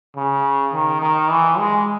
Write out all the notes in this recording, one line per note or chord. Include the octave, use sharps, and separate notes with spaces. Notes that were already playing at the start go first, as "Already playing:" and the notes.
C#3
D#3
D#3
E3
G#3